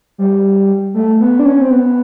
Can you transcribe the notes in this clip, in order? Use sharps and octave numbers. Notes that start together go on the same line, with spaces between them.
G3
A3
B3
D4
C#4
C4
B3